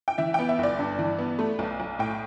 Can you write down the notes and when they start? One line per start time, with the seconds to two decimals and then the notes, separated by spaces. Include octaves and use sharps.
0.08 G5
0.18 E3 E5
0.34 B3 G5
0.49 E5
0.59 G1 D5
0.79 G2
0.98 E3
1.19 B3
1.39 A3
1.59 B1
1.80 B1
1.99 A2 G5